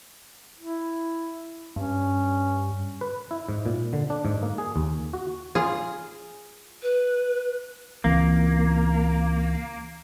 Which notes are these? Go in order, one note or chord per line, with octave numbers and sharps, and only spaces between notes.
E4
G2 C#4
B4
E4
G#2
A#2
D3
D4
G#2
A#3
G#4
D#2
F#4
F4 G#4
B4
C#2 E3 A#3 C4